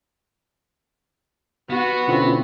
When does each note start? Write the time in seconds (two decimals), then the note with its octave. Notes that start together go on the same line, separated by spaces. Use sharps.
1.70 B3 F#4
2.08 B2 D3 C4 C#4 E4 F4